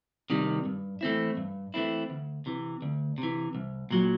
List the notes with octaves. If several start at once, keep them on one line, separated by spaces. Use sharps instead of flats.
C3 D#3 G3
G2
E3 A3 C4 E4
G2
E3 A3 C4 E4
D2
C3 E3
D2
C3
E3
C2
A#2 F#3